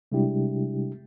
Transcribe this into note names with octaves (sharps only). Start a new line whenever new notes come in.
C3 G3 G#3 D4 E4 G4